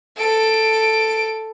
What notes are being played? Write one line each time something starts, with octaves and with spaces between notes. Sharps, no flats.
A4 D7